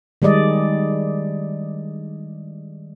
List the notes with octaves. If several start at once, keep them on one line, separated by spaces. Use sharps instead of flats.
D#3 G3 G#3 D5 D#5